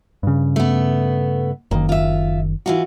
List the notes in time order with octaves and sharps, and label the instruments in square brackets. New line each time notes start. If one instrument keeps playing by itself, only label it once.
[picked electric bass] G2 C#3
[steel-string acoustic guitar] A3 B3
[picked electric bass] F#1 D#3 [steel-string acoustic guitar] A#3
[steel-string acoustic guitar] F4 E5
E3 F4 F#4